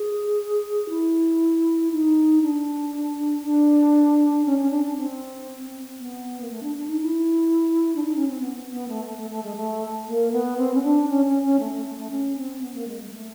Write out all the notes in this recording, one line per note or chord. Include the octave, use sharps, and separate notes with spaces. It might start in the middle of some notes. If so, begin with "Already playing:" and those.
Already playing: G#4
E4
D#4
D4
D4
C#4
C#4
D4
D4
C4
B3
A#3
A3
D4
D4
D#4
E4
D4
D#4
C#4
C4
B3
B3
A3
A3
A3
A3
G#3
A3
A#3
B3
C4
C#4
D4
C#4
C#4
C#4
A3
A3
A3
A3
C#4
C4
B3
A#3
G#3
G#3
A#3
A3